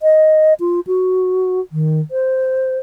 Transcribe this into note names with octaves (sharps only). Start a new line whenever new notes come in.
D#5
F4
F#4
D#3
C5